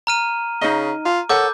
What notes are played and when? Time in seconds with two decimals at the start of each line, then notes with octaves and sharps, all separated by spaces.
0.07 A#5 F6 D#7
0.61 C#3 D#4 D#5
1.05 F4
1.29 A4 A#4 C#5 F#5 D6 G6